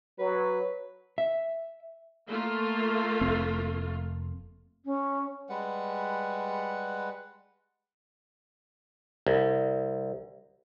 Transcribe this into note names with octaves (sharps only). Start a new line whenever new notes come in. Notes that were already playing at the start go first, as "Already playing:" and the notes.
F#3 B4
E5
A3 A#3 F4
F1 C4
C#4
G3 G#3 B4 F#5
C2